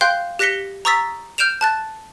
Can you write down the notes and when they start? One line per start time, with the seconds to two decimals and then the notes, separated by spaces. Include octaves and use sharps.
0.01 F5 G5 C6 F#6 G6
0.39 G4 F#6 A#6 B6 C#7 G7
0.85 A#5 C#6 D#6 E6 A6 B6
1.38 F6 G6 D7 E7 F7
1.61 A5 F#6 A6